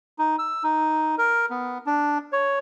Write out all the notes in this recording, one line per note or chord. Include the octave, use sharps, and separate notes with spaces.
D#4
E6
D#4
A#4
B3
D4
C#5